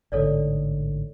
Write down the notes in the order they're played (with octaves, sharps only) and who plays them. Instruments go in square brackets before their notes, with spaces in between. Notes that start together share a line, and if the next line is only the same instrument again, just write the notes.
[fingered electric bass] A1 G#2 D3 [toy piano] A4 C#5 D5